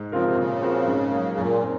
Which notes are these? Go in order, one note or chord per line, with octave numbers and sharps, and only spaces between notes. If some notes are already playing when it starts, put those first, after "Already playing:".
Already playing: G#2
C#3 F3 C4 F4 A#4
C3
A#2 C#3
F3 C4 F#4 A#4
G#2
F#3 A#3
F#2 A#2
C4 D#4